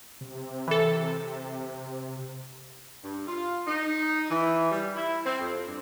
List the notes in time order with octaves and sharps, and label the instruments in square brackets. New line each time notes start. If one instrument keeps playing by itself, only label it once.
[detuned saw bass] C3
[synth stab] E3 A4
[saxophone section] G2
F4
D#4
E3
G3
E4
C4
F2
G2